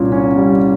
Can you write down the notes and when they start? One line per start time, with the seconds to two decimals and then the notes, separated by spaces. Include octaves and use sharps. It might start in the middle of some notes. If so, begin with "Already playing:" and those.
Already playing: C2 A#2 C#4
0.12 C#4
0.37 G3